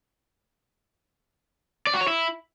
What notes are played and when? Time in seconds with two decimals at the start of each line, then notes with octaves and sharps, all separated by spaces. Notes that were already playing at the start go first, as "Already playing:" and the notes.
1.87 D5
1.94 F#4
2.01 C#5
2.08 E4